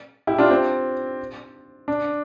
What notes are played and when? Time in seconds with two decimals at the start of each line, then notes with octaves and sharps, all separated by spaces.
0.27 E4 G4
0.38 D4 F4
0.50 C4
1.88 D4